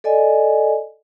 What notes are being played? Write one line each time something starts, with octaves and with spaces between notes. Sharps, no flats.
A4 D5 D#5 G#5